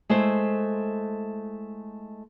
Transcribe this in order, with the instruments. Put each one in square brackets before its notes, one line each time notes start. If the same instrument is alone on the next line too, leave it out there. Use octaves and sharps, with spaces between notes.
[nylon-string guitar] G#3 A3 E4 C5